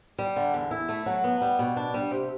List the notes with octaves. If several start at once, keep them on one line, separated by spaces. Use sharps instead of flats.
G3
D3
E2
E4
A3
F#3
B3
G3
B2
D4
G3
C3